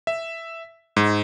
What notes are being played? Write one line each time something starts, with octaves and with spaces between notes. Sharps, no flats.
E5
G#2